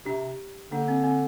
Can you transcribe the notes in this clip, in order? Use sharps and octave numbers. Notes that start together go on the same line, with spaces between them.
C3 D4 G4
D3 A#3 D4
C4
C4